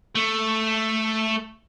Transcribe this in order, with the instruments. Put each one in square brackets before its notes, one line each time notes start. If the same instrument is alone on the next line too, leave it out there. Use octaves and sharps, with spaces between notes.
[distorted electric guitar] A3